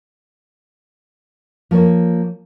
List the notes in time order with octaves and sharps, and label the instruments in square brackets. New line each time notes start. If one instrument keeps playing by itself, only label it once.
[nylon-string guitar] F3 A#3 A4 C#5